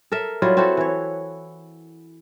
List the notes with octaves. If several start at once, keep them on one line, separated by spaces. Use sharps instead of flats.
A4 A#4 E5
F#3 G3 E4 F4
C4 E4 F#4 A4
E3 C#5